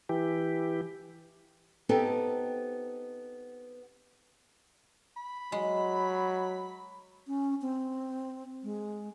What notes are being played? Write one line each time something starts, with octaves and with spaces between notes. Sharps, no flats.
E3 G4
B3 C4 D#4 G4 A4
B5
F#3 G#3
C#4
C4
G#3